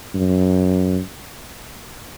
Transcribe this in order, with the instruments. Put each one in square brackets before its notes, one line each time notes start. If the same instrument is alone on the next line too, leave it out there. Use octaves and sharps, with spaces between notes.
[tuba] F#2